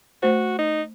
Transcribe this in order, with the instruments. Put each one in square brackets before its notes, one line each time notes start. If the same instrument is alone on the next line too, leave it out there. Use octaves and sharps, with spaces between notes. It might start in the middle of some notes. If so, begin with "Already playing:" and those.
[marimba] A3 C5 [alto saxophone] F#4
[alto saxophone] D#4